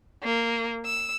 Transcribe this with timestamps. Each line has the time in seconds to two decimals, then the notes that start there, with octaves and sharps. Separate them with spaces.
0.23 A#3
0.85 E6